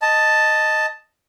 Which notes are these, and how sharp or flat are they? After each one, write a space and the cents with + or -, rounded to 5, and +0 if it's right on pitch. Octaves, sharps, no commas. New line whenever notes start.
D#5 +0 A5 +0